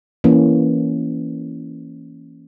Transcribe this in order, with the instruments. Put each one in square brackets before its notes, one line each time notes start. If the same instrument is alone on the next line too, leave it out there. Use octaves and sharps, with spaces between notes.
[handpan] E3 A#3 C#4